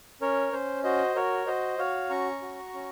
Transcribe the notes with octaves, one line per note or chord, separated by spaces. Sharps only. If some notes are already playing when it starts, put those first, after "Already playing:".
C#4 A#4 C#5
C#4 C5
F#4 C5 D#5
F#4 A#4 C#5
F#4 C5 D#5
F#4 C#5 F5
C#4 A#5 C#6
F#4
C#4